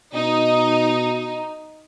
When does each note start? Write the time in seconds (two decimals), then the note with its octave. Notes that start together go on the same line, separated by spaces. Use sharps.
0.14 B2 D#4